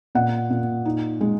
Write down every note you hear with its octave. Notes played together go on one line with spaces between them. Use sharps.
A#2 F#5
A#2
D#4
G#3